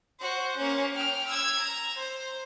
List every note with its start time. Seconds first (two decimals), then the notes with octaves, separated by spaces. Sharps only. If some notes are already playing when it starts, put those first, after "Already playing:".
0.20 F#4 C5
0.56 A#3 C#4
0.95 G5 F6
1.28 E6 G#6
1.59 A#5
1.97 C5